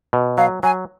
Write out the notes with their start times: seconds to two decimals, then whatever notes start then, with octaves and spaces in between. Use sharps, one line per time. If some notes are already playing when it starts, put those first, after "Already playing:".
0.13 B2
0.38 F#3 F5
0.63 F#3 G#5